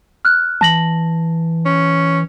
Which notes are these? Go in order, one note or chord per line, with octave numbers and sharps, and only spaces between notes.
F6 F#6
E3 A5 A#6 F#7
C#4